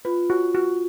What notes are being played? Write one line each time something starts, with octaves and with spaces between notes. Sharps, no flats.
F4 B4
F#4
F#4